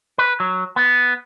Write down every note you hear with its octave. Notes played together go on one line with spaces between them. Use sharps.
B4
F#3
B3